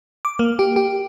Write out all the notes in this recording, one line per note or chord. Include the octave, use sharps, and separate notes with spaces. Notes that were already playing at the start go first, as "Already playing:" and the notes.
D6
A#3
G4
G4